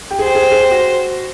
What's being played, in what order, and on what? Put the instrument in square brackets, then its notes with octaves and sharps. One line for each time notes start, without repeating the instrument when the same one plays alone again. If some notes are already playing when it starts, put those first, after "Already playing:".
[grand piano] G4
G#4
[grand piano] G4 [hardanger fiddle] C5
[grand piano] G#4
G4
G#4
G4
F#4